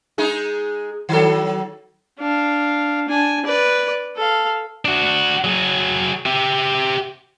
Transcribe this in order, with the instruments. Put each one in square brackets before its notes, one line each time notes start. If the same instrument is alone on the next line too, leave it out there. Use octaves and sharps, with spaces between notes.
[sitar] G#3 D#4 G#4
D#3 F#3 A4
[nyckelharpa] D4 F5
D4 G#5
B4 D5
A4 F5
[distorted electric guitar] D4 F#4
F#3 G#4
G4 E5